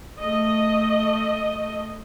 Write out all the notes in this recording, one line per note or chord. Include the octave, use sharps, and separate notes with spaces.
A3 D#5